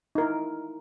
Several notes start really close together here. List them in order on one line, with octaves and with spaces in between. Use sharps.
D#4 A#4 E4